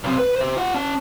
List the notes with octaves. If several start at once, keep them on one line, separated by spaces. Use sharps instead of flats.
B1 C3
B4
C5 E5
F4 F#5
C#4 A5